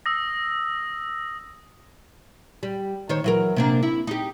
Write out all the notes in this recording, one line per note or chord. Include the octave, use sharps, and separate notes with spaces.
D#6 E6 A#6
G3
D#3 C5 C#5
E3 F#3 A#4
C3 A#3 D4
E4
D#4 G4